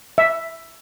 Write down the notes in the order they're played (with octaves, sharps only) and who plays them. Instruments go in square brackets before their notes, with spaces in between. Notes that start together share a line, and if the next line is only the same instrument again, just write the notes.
[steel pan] E5